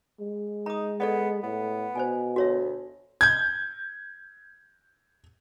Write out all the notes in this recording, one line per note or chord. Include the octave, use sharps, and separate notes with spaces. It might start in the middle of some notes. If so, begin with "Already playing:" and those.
G#3
D#4 A#5 D#6
B3 A4 D5 D#5
A2 B3
B2 C5 D5 G#5
D2 F#4 C#5 E5
G6 G#6